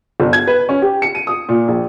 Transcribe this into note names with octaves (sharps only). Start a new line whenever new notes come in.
G1
G#6
B4
C#4
G4
C#7
D#7
D#6
A#2
A#1